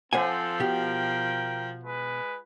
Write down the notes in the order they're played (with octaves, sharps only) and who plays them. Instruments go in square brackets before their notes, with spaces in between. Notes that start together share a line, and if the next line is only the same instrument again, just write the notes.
[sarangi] F3 [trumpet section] C4 A4 [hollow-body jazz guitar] C5 F#5 G#5
[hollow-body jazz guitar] B2 G4 [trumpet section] A#4 G5
[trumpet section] G#3 B4